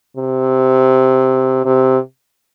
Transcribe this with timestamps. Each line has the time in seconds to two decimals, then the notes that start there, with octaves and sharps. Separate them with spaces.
0.17 C3
1.65 C3